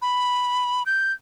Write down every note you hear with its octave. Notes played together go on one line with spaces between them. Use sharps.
B5
G6